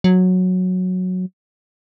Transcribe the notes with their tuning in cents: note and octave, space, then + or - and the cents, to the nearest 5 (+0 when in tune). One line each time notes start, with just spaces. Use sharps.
F#3 -10